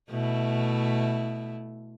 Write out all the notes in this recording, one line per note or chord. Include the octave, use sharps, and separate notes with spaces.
B2 A3 E4